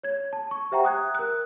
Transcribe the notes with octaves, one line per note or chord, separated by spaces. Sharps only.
C#5 G#6
A5
C#6
G4 C5 E5 F#5 G5 A#5
D#6 F#6 G#6
A#4 F#6